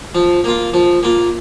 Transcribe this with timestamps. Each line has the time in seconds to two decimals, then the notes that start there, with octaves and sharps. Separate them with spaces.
0.15 F3
0.44 A#3 F4
0.74 F3
1.03 A#3 F4